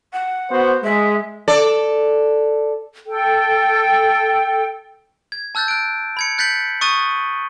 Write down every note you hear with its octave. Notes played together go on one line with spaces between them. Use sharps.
F#5
B3 F#4 C5
G#3 E5
A4 D5
A4 G5
G#6
A5 E6 F#6 G6 A6
F#6 D7
B5 G#6 C#7
F#6 G6 A6 B6 C#7 F#7
C#6 D#6 F#6 A6 D#7 G7